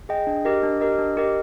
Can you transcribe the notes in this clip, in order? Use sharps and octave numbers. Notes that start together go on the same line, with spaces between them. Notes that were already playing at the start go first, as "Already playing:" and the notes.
G#4 D#5 G5
D4
G4 A#4 D#5
D4
G4 A#4 D#5
D4
G4 A#4 D#5